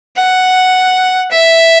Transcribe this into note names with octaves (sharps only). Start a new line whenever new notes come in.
F#5
E5